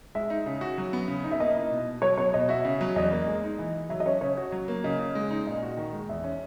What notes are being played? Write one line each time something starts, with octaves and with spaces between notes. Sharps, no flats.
G#3 E5
D#4
C#3
F#4
F#3
B3
C#3
D#4
E5
A#3 D#5
E4
B2
B2
F#3 C#5
B3 C#5
B2 D#5
F#4 E5
C#3
F#3
E2 D#5
A#3
G#3
D#4
E3
E3
F#3 E5
D#5
C#4 C#5
C#3 C#5
F#4
F#3
A#3
C#3 D#5
C#3
G#3
D#4
A#2 D#5
F#4
D#3
G#3
E2 E5
C#4